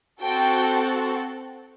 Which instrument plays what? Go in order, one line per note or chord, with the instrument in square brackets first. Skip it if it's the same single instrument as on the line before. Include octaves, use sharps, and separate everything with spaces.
[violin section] C4 F#4 A4 G5